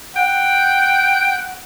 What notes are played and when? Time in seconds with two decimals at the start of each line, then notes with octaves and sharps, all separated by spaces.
0.16 F#5 G5